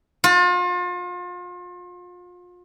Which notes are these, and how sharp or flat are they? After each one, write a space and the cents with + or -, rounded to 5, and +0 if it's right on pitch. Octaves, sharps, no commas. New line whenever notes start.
F4 +35